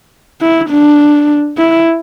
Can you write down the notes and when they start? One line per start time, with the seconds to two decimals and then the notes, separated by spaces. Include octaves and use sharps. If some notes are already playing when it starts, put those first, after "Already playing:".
0.41 E4
0.70 D4
1.58 E4